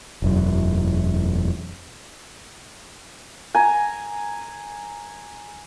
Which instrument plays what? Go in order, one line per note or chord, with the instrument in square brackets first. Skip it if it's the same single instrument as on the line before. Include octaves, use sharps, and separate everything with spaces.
[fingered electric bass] E1 F#2
[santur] G#5 A#5